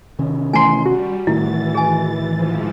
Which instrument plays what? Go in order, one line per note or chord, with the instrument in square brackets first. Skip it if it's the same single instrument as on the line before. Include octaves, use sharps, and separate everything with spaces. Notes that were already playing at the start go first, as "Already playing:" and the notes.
[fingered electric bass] C3 D#3 C#4
[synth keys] A2 E3 C6 [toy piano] G#5 A#5
[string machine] G3 [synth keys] F#4
[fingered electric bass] A2 D#3 A3 [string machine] E3 A6 [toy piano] E4
[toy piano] G#4 G#5
[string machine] G#2 E3 F3